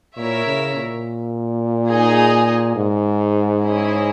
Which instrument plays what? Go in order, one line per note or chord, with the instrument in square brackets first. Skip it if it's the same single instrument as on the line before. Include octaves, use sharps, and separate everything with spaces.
[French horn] A#2 [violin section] E4 A#4 C#5 E5
[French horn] C#3
A#2
[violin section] D#4 G#4 D#5 G#5
[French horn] G#2
[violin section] C#4 E4 G#4 D#5